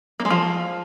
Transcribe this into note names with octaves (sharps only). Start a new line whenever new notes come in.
A#3
G#3
F3